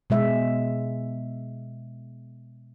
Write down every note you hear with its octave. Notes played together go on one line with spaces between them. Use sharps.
B2 G#3 E5